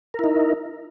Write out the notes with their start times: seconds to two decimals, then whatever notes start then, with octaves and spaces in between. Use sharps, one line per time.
0.14 A#4
0.19 E4
0.24 D#4